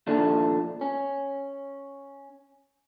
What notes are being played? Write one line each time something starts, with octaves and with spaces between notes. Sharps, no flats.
A#2 D3 D#3 F3 A3 D4
C#4